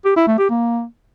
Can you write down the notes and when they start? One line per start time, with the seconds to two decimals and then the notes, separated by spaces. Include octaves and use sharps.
0.05 G4
0.16 E4
0.27 A3
0.38 G4
0.49 A#3